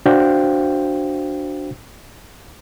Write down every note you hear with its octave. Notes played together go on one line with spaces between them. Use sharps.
D4 F#4 C5 F5 G5